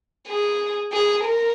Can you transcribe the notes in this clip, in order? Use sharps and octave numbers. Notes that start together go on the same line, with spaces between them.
G#4
G#4
A#4